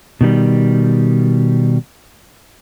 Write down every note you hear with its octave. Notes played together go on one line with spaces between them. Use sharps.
B2 D#3 G3